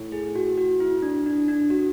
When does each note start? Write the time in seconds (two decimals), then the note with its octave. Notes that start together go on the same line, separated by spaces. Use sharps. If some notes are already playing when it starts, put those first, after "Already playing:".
Already playing: A2
0.12 G#4
0.35 F#4
0.57 F#4
0.80 E4
1.02 D4
1.26 D4
1.48 D4
1.70 F#4